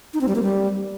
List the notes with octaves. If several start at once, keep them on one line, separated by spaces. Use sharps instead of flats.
D#4
C4
G3
A#3
G3